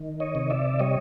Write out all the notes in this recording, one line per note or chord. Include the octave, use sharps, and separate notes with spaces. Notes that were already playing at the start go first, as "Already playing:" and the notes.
Already playing: D#3
C#5 D#5
C3
D5 E5
G3 C#5 D#5